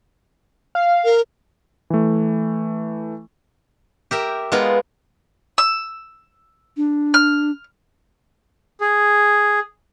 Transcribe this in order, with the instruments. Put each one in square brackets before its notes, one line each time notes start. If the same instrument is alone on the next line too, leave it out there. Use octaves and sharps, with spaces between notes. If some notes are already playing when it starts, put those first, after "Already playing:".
[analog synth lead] F5
[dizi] A#4
[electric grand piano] E3 A3
[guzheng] G4 A#4 E5
G#3 B3 F4 A#4
[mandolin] E6
[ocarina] D4
[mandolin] F6
[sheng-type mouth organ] G#4